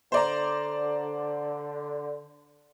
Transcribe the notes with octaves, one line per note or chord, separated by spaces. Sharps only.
D3 C5 D5 A#5